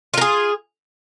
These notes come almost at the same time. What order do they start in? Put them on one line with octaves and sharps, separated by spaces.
F4 A#4 G#4